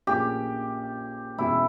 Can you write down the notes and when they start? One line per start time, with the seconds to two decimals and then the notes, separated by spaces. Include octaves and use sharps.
0.07 A#1 A#2 A#3 C#4 G4 G#4
1.38 E2 B2 G#3 C#4 E4